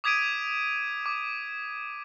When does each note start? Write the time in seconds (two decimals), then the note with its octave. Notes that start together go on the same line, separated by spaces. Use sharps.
0.04 D6 D#6 G#6 B6 D7 D#7
1.06 D6